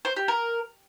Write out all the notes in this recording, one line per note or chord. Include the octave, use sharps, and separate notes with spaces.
C5
G4
A#4